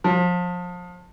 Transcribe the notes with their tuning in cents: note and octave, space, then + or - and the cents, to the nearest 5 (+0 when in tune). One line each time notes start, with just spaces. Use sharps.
F3 +30